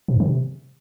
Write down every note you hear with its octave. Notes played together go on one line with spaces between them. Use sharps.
B2
F#2
D#3
C3